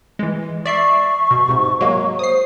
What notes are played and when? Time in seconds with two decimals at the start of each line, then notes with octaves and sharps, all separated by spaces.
0.19 E3 G#3
0.66 D5 E5 C#6 C7
1.31 B2
1.49 G#2 C3
1.81 F#3 G#3 A#3
2.19 C5 D#6 C7